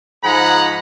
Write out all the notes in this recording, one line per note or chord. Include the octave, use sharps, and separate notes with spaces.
G#2 F3 G#4 F#5 A#5 B5